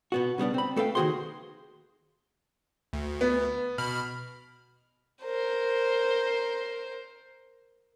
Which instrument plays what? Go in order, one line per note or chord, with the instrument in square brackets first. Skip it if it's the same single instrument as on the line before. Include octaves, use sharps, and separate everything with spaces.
[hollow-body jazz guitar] B2 B3 F#4
C#3 G3 B3 D4
C4 B5
A3 A4 B4 F5 G5
D#3 A#3 F#4 G#4 C5 C6
[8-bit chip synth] D2
[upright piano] B3
[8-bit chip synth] B2 B5 F6
[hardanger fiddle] A#4 C5